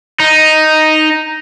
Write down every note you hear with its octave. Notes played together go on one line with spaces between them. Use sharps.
D#4